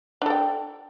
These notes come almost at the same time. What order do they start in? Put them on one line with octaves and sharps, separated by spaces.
D4 A4 G5